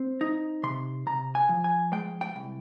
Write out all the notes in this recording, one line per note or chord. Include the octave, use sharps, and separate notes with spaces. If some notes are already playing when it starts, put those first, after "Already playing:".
Already playing: C4
D#4
C3 C6
C3 A#5
G#5
F3
G#5
G#3 G5
G5
C2